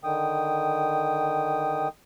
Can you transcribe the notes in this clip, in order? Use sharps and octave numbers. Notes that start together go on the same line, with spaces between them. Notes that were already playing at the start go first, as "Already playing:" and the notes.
D3 D#3 G5 D#6